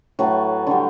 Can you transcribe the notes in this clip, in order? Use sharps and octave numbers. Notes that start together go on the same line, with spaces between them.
A2 F#3 A3 B4
D3 G3